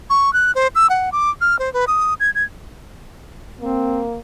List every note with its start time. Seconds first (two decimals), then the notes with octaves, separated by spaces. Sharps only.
0.10 C#6
0.33 F#6
0.55 C5
0.75 E6
0.90 F#5
1.12 D6
1.41 F6
1.59 C5
1.74 B4
1.88 D#6
2.20 G#6
2.35 G#6
3.61 A#3 C4